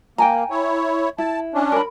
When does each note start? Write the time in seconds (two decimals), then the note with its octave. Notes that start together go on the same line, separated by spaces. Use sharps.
0.18 A#3 G5 G#5 A#5
0.50 E4 C#5
1.18 E4 A5
1.54 C#4 D4
1.72 A#4 B5